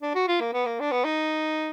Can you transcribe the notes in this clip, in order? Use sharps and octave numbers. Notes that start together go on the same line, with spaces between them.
D4
F#4
F4
A#3
B3
A#3
D4
B3
D#4